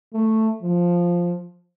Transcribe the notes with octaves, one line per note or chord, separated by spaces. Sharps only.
A3
F3